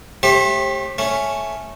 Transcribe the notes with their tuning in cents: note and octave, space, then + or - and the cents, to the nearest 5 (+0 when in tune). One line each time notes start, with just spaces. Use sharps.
A3 -10 G4 +10 C5 +45
A3 +0 C#4 +0